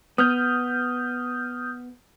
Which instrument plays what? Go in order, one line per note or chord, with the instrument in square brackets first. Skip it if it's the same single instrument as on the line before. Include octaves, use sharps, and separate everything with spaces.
[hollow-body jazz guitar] B3 [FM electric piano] D#6 F6 G6